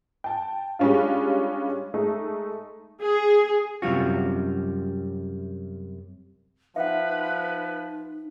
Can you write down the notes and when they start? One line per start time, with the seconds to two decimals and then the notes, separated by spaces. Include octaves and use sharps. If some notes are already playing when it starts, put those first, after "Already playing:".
0.24 G5 A5
0.79 G3 G#3 C#4 D4 F4
1.94 G#3 A3 D#4
3.03 G#4
3.82 F#2 C3 G3 F4 F#4
6.76 F3 D#4 B4 E5 F#5